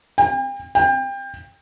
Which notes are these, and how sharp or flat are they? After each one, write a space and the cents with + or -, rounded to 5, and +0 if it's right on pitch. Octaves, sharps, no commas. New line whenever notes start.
G5 +40
G5 +25